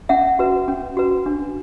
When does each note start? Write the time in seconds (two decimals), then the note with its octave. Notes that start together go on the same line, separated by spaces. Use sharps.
0.09 C#4 E5 F#5
0.39 F#4 B4
0.68 C#4
0.97 F#4 B4
1.26 D4